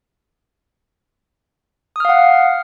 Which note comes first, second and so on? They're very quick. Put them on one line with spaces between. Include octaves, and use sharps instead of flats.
D#6 F6 F5 F#5